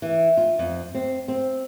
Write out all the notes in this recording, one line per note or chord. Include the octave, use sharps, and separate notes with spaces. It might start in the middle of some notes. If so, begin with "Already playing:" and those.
E3
F4
F2
C4
C4